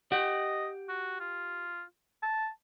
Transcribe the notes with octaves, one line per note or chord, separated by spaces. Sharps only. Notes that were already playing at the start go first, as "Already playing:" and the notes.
G4 D#5 F#5
F#4
F4
A5